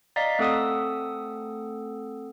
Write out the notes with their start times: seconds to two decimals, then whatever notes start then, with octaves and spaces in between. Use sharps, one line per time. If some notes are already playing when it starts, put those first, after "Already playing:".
0.16 D5 D#5 F5 A#5 A6 B6
0.39 A3 C4 A4 F#5 D#6 E6